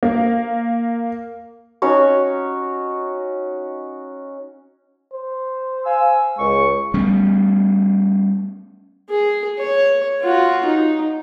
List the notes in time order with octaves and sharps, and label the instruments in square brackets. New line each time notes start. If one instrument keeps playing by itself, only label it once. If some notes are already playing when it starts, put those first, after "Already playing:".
[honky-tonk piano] A#3
[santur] C#4 D#4 F#4 C#5
[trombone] C5
[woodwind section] F5 G#5 E6
[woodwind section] C#2 C#6 [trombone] G#3
[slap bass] G3 A3 B3 C#4
[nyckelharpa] G#4
C#5
F4 F#4
D#4